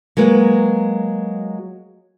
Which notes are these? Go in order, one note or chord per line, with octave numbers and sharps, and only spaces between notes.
F#3 G#3 A#3 B4